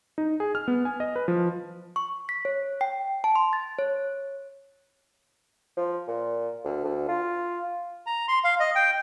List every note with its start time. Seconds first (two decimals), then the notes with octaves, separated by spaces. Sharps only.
0.18 D#4
0.40 G#4
0.55 F6
0.68 B3
0.85 G#5
1.00 D#5
1.16 B4
1.28 F3
1.96 C#6
2.29 B6
2.45 C#5
2.81 G5
3.24 A5
3.36 C6
3.53 A6
3.79 C#5
5.77 F3
6.08 A#2
6.65 D2
6.84 D2
7.08 F4
8.06 A#5
8.28 C6
8.44 F5
8.60 D#5
8.75 G5